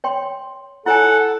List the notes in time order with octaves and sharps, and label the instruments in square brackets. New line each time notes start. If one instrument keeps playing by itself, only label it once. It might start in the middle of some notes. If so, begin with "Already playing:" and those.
[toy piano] C#5 G5 C6
[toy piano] E4 C#5 G#5 [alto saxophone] A4 [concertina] F#5